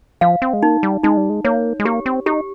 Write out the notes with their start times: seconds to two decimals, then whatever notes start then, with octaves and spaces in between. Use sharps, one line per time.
0.21 F3 F5
0.42 C4
0.53 G#3
0.63 A#3 D#4
0.83 G3
1.04 G#3 D#4
1.17 G3
1.30 G#3
1.44 A#3 C#5
1.80 G#3
1.85 A#3 G4
2.06 C4
2.26 D#4 G4